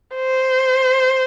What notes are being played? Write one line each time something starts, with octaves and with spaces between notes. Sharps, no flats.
C5